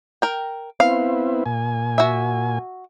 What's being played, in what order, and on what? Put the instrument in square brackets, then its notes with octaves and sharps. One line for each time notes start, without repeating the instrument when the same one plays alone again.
[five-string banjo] A#4 G5
[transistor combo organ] B3 C4 E4 [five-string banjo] F5
[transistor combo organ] A#2 G#5
[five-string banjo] F#4 E5